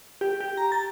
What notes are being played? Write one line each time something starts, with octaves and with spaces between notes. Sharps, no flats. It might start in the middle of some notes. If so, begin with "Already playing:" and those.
G4
G4
A#5
A6